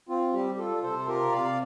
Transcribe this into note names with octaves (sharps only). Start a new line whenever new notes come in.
C4 F4
G3 G4
G4
F4 A4
C3 A4 C5
A4
F4 G4 A#4
C3 D5 F5